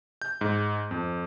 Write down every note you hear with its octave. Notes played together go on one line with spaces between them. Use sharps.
G6
G#2
F2